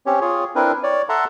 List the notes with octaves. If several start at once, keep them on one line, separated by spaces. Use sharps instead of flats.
C4 C#4 G4 C#5
F4 G#4 C#5
C4 D4 E4 A#4 B4
C#5 D5
A4 E5 F#5 A5 A#5 C6